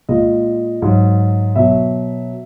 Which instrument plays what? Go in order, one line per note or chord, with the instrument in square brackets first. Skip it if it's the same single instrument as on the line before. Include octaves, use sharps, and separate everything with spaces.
[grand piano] A#2 G#3 D#5
G#2 F#3
B2 F#3 E5